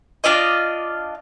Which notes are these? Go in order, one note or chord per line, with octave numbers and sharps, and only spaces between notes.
D4 F4 D5 D#5